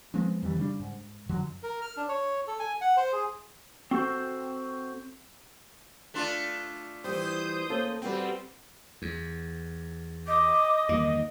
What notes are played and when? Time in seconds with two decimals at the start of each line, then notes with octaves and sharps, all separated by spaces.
0.14 F3 G#3 B3 C4
0.42 F2 D#3 E3 G3
0.57 C#3 G3 D4
0.80 G#2
1.29 F#2 D3 F#3
1.63 A#4
1.81 F6
1.97 D4
2.09 C#5
2.47 A4
2.59 G#5
2.81 F#5
2.97 C5
3.12 G#4
3.91 C4 F#4 A4 C5
6.14 A3 D4 F4
7.04 E3 G3 C5 D#6 G6
7.69 A#3 C#4 A4
8.02 G3 B3 C4 F#4 B4
9.02 E2
10.27 D#5 D6
10.89 E2 G2 D#3 A#3